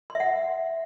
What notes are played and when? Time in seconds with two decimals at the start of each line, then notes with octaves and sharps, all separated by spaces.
0.10 C6
0.15 E5
0.20 F#5